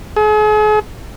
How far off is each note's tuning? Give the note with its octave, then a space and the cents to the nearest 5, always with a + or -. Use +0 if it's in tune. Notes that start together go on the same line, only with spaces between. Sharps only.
G#4 +40